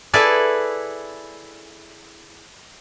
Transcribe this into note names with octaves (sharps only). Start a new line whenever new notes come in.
E4 G#4 A4 B4 D5